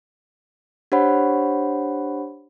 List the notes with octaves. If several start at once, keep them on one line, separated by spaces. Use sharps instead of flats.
D4 G4 C5 C#5 F#5 B5